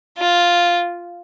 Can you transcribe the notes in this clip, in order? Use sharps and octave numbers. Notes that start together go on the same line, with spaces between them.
F4